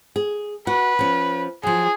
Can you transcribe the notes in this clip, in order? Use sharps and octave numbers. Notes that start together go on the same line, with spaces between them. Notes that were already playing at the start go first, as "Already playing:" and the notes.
G#4
F#4 B4
F3 C#4
F3 F#3 G#4